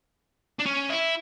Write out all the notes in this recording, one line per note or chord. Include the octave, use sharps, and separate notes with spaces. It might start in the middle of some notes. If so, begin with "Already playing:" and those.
D4
C#4
E4